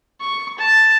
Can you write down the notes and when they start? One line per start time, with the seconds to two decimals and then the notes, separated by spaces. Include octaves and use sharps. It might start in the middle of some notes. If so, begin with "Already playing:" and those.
0.20 C#6
0.58 A5